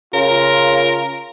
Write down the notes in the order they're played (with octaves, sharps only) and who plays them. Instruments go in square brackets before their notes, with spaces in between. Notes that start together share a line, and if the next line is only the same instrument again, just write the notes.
[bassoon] C#3 [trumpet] F4 [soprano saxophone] A#4